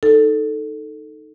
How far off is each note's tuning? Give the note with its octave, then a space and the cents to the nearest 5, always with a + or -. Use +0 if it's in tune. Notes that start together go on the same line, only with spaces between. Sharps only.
D#4 +0 A4 +0